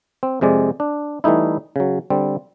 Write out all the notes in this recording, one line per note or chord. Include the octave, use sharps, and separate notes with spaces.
C4
F2 C3 G#3 D5
D4
E3 G3 A3 D#4 E4
C#3 F#3
D3 G3 C4